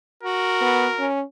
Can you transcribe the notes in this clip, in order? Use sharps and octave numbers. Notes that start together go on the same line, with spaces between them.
F#4 A#4
B3
C#4